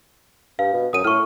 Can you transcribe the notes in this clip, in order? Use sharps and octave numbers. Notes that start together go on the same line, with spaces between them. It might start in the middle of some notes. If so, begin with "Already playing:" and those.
G2 F5
B2
F#2 D#6 D#7
A2 C#6 F6